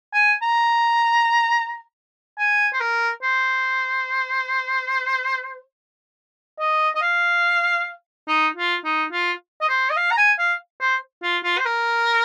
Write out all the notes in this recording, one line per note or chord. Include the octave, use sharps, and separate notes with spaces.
G#5
A#5
G#5
C5
A#4
C5
D#5
D#5
F5
D#4
F4
D#4
F4
D#5
C5
D#5
F5
A#5
G#5
F5
C5
F4
F4
C5
A#4